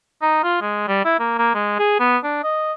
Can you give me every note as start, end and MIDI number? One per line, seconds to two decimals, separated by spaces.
0.22 0.41 63
0.43 0.57 65
0.61 0.84 56
0.88 1.03 55
1.05 1.18 64
1.19 1.37 58
1.38 1.50 58
1.54 1.79 56
1.79 2.00 68
2.00 2.17 59
2.23 2.39 62
2.43 2.73 75